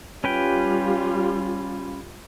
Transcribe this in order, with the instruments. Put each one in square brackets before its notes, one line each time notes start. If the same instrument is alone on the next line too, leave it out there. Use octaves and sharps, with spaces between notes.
[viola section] G3 F4 [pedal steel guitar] C#4 B4 G5